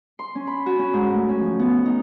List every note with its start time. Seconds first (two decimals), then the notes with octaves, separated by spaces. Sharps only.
0.19 C6
0.35 C#4
0.47 B5
0.66 F#4
0.79 C#4
0.93 G#2
1.14 A3
1.29 C#4
1.40 F3
1.59 B3
1.86 D#4